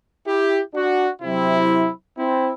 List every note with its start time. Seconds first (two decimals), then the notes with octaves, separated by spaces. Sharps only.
0.27 E4 G4
0.74 D4 F#4
1.22 C3 F#3 C4 E4
2.18 C4 E4